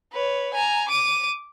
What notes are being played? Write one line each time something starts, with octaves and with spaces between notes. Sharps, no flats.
B4 C#5
G#5 A#5
D6 D#7